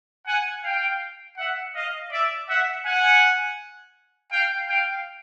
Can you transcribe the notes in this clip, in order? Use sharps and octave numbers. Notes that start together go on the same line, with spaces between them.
F#5 G#5
F5 G5
E5 F#5
D#5 F5
D5 E5
E5 F#5
F#5 G#5
F5 G5
F5 G5